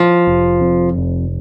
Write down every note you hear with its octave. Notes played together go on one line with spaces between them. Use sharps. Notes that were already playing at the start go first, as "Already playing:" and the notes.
Already playing: F3
F1
F2
F1